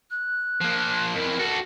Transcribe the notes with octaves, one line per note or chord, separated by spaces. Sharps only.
F#6
F3 A#3
F2 E3 A#4
F#4 A4